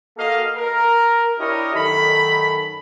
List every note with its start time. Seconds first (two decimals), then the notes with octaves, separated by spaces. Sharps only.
0.17 A#3 F#4 A4 D#5 F5
0.56 A#4
1.38 D4 E4 G4 A#4 C#5 D#5
1.74 F#2 D#3 A4 B5